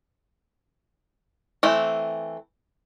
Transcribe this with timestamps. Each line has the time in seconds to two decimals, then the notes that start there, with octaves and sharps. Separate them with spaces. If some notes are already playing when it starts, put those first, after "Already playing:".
1.63 E3 A3 C4